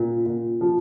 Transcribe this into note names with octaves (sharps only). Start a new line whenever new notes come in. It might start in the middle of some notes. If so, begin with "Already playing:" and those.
Already playing: A#2
A#2
F3